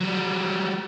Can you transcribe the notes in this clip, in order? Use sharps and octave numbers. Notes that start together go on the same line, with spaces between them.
F#3 G3